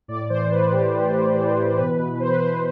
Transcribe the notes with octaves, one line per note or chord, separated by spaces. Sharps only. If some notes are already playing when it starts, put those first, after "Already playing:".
A2 D5
E3 C5
A2 B4
A2 G4
E3
A2
E3
E3
B2 B4
B2
B2 C5
B4
B2 C5